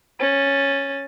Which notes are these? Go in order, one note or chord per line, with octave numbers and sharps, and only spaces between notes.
C#4 A6